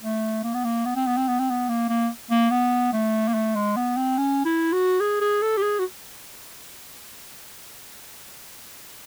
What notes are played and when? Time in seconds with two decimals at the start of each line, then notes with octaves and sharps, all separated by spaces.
0.03 A3
0.44 A#3
0.54 B3
0.64 A#3
0.85 B3
0.96 C4
1.07 B3
1.17 C4
1.28 B3
1.39 C4
1.50 B3
1.69 A#3
1.89 A#3
2.31 A#3
2.51 B3
2.93 A3
3.28 A#3
3.34 A3
3.56 G#3
3.77 B3
3.97 C4
4.18 C#4
4.45 E4
4.73 F#4
5.00 G#4
5.21 G#4
5.42 A4
5.57 G4
5.63 G#4
5.79 F#4